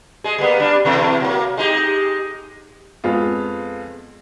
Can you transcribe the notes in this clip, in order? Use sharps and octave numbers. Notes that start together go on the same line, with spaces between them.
G#3 G#4
G3 A#3 B3
G3 D4
B2 E3 A3
F#3 A#3
G#3 D#4 G4
F2 G#3 B3 F4